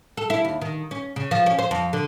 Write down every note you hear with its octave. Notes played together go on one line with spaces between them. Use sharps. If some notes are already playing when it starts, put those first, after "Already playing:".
A4
E4
D#2
D#3
C#4
C#3
F3
C#4
C5
F2
D3